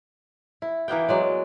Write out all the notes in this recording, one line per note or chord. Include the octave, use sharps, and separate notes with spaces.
E4
E3 A#3 B3 G5
F#3 G#3 D5